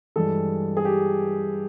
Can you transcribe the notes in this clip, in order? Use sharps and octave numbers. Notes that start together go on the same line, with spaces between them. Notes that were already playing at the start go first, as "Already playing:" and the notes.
G2 E3 G#3 A4
G#4
G4